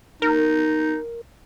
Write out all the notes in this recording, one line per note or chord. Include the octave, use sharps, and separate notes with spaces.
D#4 A#4